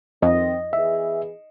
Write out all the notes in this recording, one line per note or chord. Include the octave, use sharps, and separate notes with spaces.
F2 D#3 C4 D#5
E3 B3 G#4 E5